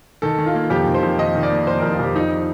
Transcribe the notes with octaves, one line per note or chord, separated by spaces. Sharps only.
D#3 A4
D#3
F4
A#3
F2 G4
D#3
C5
F2
D#3 D#5
D#3
D5
A#3
F2 C5
F2 A#4
F4
F2 G4
F3 D#4
D#4